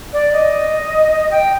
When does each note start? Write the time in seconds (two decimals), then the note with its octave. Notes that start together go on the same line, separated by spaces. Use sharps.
0.13 D5
0.33 D#5
1.31 G5